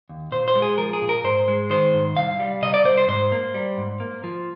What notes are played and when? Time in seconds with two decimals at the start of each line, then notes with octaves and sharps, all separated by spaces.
0.09 D#2
0.31 A#2 C5
0.48 C5
0.55 G#3
0.62 G#4
0.78 F3 A#4
0.93 G#4
1.02 A#2
1.09 A#4
1.24 G#2 C5
1.48 G#3
1.70 D#3 C5
1.94 G#2
2.16 C2 F5
2.40 G3
2.62 C3 D#5
2.74 D5
2.85 C2 C5
2.98 C5
3.08 G#2 C5
3.32 A#3
3.54 G3
3.78 G#2
4.00 A#3
4.24 F3